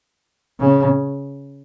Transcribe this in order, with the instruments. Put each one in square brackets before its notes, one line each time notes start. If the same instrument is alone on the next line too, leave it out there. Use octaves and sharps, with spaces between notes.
[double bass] C#3